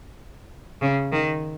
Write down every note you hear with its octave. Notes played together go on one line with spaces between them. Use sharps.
C#3
D#3